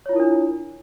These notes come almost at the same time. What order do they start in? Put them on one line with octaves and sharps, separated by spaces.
C#5 F4 E4 A#4 D4